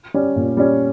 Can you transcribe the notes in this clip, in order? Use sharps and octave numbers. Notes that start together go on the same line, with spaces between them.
G3 C#4
A#2
G3 C#4